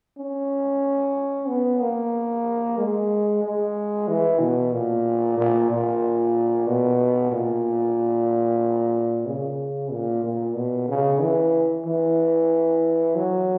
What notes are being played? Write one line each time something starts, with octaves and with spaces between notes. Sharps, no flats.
C#4
B3
A#3
G#3
G#3
E3
B2
A#2
A#2
A#2
B2
A#2
C#3
A#2
A#2
B2
C#3
E3
E3
F#3